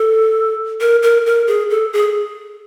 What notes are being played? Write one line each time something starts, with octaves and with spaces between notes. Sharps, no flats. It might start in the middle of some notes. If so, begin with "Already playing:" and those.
Already playing: A4
A#4
A#4
A#4
G#4
A4
G#4